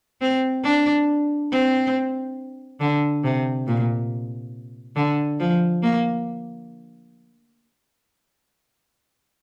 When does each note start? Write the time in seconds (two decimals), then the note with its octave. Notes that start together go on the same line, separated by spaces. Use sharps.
0.21 C4
0.64 D4
1.52 C4
2.80 D3
3.24 C3
3.67 A#2
4.96 D3
5.40 F3
5.83 A#3